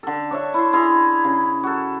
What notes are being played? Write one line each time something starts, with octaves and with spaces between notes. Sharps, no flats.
D3 A4
D4 C#5 E5
E4 C6
E4 G#4 A#5 C6
C#3
F#4 A4